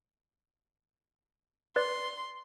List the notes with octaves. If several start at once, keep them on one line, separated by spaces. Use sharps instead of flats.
B4 D5 C6